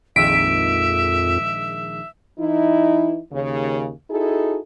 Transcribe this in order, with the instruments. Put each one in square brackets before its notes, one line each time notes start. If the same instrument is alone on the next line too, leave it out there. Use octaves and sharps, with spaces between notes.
[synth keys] A#1 D#3 G#3 [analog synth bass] F2 [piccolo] E5 [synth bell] B6 D7
[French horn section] E3 D#4 E4
D#2 C#3
D#4 E4 F#4 G#4 A4